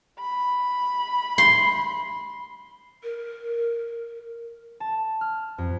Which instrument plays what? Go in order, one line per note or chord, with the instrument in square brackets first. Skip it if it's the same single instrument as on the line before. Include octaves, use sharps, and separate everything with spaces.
[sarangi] B5
[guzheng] C6
[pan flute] A#4
[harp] A5
F6
F2